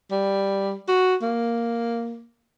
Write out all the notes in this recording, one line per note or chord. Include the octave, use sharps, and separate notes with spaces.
G3
F#4
A#3